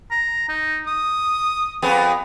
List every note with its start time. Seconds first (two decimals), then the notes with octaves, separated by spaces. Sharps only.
0.11 A#5
0.49 D#4
0.87 D#6
1.82 F2 B3 G#4